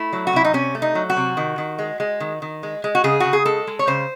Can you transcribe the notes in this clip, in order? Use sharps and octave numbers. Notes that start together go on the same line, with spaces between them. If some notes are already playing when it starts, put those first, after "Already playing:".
Already playing: A3 E4
F#3
F#4
C3 E4
D#4
C3 C#4
A3
D#4
F#3
F#4
C3
D#3
D#3
G#3
G#3
D#3
D#3
G#3
G#3
F#4
C#3 G#4
C#3 F#4
G#4
G#3 A4
G#3
C#5
C#3 C5